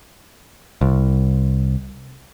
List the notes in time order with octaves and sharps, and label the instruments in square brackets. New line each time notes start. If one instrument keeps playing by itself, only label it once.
[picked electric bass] C2